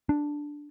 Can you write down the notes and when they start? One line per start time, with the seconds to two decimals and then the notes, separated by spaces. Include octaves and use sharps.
0.09 D4